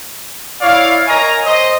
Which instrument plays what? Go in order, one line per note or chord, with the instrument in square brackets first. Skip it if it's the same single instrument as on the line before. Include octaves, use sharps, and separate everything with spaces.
[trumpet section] E4 C#5 D5 F5
A#4 C#5 D#5 G#5 A#5
C5 D#5